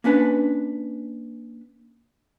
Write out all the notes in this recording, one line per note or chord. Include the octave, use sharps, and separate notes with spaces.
A#3 C#4 D4 B4